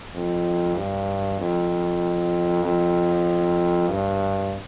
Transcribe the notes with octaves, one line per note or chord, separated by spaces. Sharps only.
F2
G2
F2
F2
G2